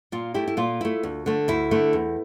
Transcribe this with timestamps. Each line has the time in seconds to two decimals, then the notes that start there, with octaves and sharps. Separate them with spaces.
0.12 A#2 F4
0.34 A3 E4 G4
0.48 E4
0.57 A#2 F4
0.81 A3 E4
1.03 D2
1.26 D3 A3
1.48 D2 E4
1.71 D3 A3
1.93 E2